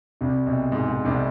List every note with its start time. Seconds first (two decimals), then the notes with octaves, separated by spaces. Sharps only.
0.21 C2 C3
0.46 B1 B2
0.72 G#2
0.88 G#2
1.05 C2 C3